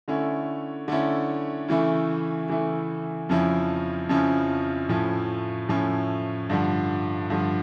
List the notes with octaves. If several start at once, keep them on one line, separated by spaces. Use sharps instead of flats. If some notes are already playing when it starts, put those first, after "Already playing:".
D3 A3 C#4 E4
D3 A3 C#4 E4
C#3 E3 A3 E4
C#3 E3 A3 E4
F2 C#3 F3 C#4 E4
F2 C#3 F3 C#4 E4
A2 F3 C#4 E4
A2 F3 C#4 E4
G2 D3 F3
G2 D3 F3